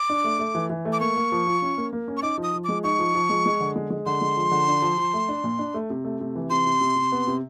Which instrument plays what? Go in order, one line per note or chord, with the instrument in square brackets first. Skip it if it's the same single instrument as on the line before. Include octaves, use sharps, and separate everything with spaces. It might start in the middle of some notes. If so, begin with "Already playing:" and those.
Already playing: [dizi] D6
[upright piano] D4
A3
A3
E3
E3
A3
[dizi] D6
[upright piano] A#3 [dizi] C#6
[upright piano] A#3
F3
F4
C#4
A#3
A#3
C#4
[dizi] C#6
[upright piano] D#4 [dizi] D6
[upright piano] F3
[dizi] D#6
[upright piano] F3
[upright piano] G#3 [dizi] D6
[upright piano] D#4 [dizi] C#6
[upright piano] F3
F3
G#3
G#3
D3
G#3
G#3
[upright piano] D3 [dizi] C6
[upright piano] G#3
F3
D3
D4
F3
F3
A3
D4
A#2
D4
A3
C3
A3
C3
E3
[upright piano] C3 [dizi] C6
[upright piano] C3
C3
C3
B3
C3